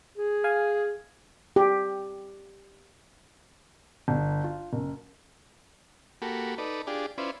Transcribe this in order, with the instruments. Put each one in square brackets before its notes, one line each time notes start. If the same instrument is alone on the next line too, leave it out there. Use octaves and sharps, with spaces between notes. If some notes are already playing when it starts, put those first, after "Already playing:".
[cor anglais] G#4
[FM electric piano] F5 G#5
[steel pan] G4
[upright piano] G1
F4
F#1
[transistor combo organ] A#3 F#4 G4 A4 B5
D#4 A4 B4 D5
D4 F4 G4 G#4 D5
C#4 E4 F4 B4 C5 D5